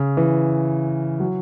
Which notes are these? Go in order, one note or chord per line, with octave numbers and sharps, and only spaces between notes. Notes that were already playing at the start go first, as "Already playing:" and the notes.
Already playing: C#3
E3
F#3